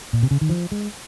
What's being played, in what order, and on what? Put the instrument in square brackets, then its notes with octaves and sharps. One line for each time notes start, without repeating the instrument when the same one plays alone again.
[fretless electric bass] A#2
C3
C#3
D#3
F3
G#3